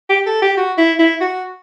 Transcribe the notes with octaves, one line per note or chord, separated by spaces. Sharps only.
G4
A4
G4
F#4
E4
E4
F#4